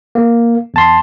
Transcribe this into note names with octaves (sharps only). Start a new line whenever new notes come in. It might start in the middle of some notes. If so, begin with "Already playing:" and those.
A#3
E2 A5 C6